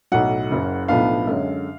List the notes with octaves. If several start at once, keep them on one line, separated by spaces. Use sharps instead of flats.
B1 A2 F#3 F#5
F#1 F#2 C#3
B1 A2 F3 B3 D4 F5
F#2 D3 G#3 C#4